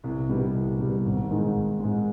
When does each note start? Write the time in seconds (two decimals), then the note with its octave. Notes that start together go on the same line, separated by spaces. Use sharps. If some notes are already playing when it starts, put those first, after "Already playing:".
0.04 C2
0.29 B2 G3 B3
0.55 C2
0.79 B2 G3 B3
1.05 G#1
1.29 G#2 D#3 G#3
1.54 G#1
1.80 G#2 D#3 G#3